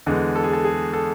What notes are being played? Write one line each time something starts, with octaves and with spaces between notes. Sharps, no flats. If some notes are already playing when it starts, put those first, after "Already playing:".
E2 D3 G#3
A4
G#4
A4
G#4
A4